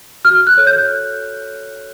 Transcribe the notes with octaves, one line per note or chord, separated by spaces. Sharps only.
F#4 F6
F#6
A4 C#5
G6